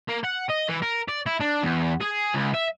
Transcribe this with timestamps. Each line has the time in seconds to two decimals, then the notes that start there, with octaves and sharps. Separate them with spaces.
0.08 A#3
0.24 F#5
0.49 D#5
0.68 E3
0.82 A#4
1.09 D5
1.26 E4
1.40 D4
1.63 E2
2.01 G#4
2.35 C#2
2.55 E5